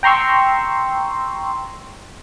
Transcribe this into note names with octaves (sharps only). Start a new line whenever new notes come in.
G5 A#5 C6 C#6 E6